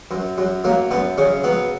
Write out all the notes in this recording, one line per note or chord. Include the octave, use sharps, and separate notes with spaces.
F#2
F#2
F#3 A#3
F#2 B3
C#3 C#4
F#3 B3